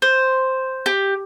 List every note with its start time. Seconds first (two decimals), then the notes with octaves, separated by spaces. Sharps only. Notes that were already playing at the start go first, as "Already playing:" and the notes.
0.02 C5
0.86 G4